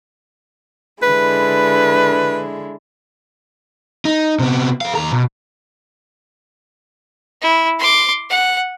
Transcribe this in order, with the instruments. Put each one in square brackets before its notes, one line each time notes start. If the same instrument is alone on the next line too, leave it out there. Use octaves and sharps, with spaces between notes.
[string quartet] D3 G#3 E4 [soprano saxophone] B4
[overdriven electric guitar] D#4
C3 B3
A4 F5
D#2 A#5
B2
[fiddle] E4
C6 D6
F#5